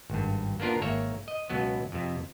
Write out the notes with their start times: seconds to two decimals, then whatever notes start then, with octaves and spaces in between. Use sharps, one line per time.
0.10 G#1 G2
0.60 A#3 B3 D4 F4 A#4
0.82 G#1 A#3 C#5 E5
1.28 D#5
1.50 C#2 B2 F#3 B3
1.92 F2 C3